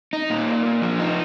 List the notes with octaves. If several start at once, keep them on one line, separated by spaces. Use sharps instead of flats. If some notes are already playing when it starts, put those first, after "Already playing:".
D#4
A#2
A#3
A#2
F3
D#4